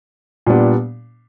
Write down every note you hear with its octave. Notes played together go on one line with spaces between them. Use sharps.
A#2 G3 B3 D4